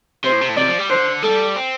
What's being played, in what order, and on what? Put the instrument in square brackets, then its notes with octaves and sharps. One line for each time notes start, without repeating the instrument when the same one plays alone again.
[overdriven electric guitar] C3 [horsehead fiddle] C5
[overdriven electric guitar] A2
C3
A2
[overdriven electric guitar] C3 [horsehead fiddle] D5
[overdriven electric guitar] F3
G3
[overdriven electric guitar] D3 [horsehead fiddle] C5
[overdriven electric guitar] G3 [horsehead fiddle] A4
[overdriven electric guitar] C4